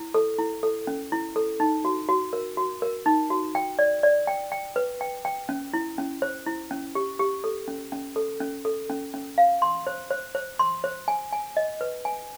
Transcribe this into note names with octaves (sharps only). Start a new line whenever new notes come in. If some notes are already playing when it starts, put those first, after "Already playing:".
Already playing: E4
A4
E4
A4
C#4
E4
A4
D#4
F#4
F#4
A#4
F#4
A#4
D#4
F#4
G5
D5
D5
G5
G5
B4
G5
G5
C#4
E4
C#4
C5
E4
C#4
G4
G4
A4
C#4
C#4
A4
C#4
A4
C#4
C#4
F5
C6
C5
C5
C5
C6
C5
G#5
G#5
D#5
B4
G#5